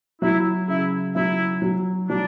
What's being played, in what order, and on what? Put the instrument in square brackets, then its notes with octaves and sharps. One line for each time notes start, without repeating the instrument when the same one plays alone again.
[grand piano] F#3 [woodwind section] E4
[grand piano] C#3 [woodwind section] E4
[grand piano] F#3 [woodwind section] E4
[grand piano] F#3
[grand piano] F#3 [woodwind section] D4